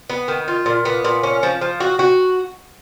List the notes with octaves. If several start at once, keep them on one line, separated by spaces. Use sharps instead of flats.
B3
D#3
F4
A#2
B3
A#2
C#4
F3
F3
F#4
F#4